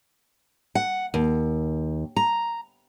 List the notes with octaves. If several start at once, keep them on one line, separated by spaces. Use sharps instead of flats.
F#5
D#2
A#5